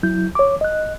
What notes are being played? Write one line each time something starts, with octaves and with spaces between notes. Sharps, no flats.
F#3 E4 G6
C#5 D6
D#5 F#6